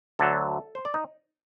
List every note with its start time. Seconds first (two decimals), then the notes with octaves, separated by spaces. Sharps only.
0.19 D2 D3 F#3 A4
0.75 C5
0.85 D5
0.94 D#4